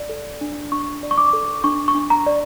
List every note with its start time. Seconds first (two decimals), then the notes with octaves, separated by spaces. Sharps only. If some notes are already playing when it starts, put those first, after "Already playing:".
Already playing: D5
0.09 A4
0.41 D4
0.72 D4 C#6
1.03 D5
1.11 C#6
1.18 D6
1.33 A4
1.64 D4 C#6
1.88 C#6
1.95 D4
2.10 A#5
2.26 D5